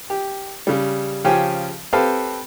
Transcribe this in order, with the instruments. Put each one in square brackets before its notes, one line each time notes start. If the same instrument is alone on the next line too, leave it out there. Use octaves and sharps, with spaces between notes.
[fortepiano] G4
C#3 G3
C#3 F3 C#4 G4 G5 G#5
C4 G4 A4 B4 F5